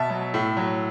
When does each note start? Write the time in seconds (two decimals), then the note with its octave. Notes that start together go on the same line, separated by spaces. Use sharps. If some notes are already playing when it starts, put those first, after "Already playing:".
Already playing: B2 E5 A5
0.10 F#3
0.34 A2
0.57 F#3